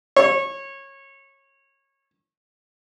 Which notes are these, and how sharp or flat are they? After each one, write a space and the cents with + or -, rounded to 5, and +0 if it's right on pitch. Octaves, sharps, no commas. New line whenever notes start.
C#5 -20